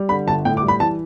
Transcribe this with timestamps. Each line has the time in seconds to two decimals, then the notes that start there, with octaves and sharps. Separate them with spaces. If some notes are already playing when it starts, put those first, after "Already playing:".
Already playing: G3
0.09 D3 B5
0.27 G1 A5
0.45 A2 G5
0.57 D6
0.63 G3
0.68 B5
0.80 E3 A5